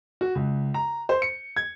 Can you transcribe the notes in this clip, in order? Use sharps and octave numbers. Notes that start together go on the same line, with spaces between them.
F#4
C#2
A#5
C5
C#7
G#6